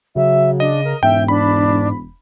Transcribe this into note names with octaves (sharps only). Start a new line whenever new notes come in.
C#3 F#3 E5
D4 D#5
A#4
E1 G#2 E5 G5
D4 B5